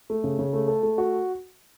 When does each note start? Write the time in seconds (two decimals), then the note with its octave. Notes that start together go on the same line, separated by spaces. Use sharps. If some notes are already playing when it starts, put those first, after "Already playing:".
0.10 A3
0.24 C#3
0.39 C#3
0.53 A3
0.68 A4
0.83 A3
0.98 F#4